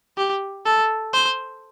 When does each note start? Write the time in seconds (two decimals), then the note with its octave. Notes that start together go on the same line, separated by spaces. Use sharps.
0.17 G4
0.66 A4
1.13 C5